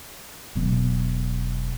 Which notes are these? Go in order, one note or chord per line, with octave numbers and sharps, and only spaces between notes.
E1 B2 F#3 B3